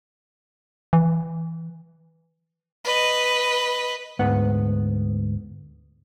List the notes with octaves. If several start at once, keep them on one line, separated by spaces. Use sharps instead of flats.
E3
B4 D#5
D2 G#2 B3 F#5